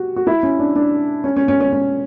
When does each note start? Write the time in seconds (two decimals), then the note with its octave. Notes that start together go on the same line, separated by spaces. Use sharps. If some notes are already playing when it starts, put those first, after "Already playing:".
Already playing: F#4 G4
0.16 F#4
0.27 E4
0.43 C#4
0.59 D4
0.75 D4
1.24 C#4
1.37 C#4
1.48 C#4
1.60 C#4
1.72 C#4